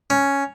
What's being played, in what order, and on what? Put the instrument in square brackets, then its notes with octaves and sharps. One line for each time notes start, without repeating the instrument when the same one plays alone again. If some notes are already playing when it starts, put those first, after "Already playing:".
[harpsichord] C#4